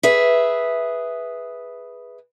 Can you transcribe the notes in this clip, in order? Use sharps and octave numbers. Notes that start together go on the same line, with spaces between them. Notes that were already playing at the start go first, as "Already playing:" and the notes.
G#4 B4 E5